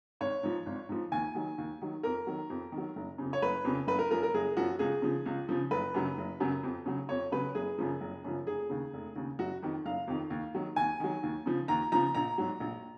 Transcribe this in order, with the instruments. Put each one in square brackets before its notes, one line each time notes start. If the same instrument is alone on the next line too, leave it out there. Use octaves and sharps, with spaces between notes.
[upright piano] G#1 C#5
G#2 F3
G#1
G#2 F3
D#2 G#5
D#3 F#3
D#2
D#3 F#3
F2 A#4
D#3 F#3
F2
D#3
F#3
F#1
F2 C#3
C#5
F#1 B4
F2 C#3
F#1 B4
A#4
F#2 F3 A#4
A#4
F#1 G#4
F#2 F3 F#4
C#2 G#4
C#3 F3
C#2
C#3 F3
F#1 B4
F#2 C#3 F#3
F#1
F#2 C#3 F#3
F2
C#3 F#3
F2 C#5
C#3 F#3 B4
F#1 G#4
F#2 C#3 F3
F#1
F#2 C#3 F3
F1 G#4
D#2 C#3
F1
D#2 C#3
F#1 F#4
F2 D#3
F#1 F5
F2 D#3
D#2
D#3 F#3
D#2 G#5
D#3 F#3
D#2
C#3 F3
D#2 A#5
C#3 F3 A#5
A#1 A#5
G#2 F#3
A#1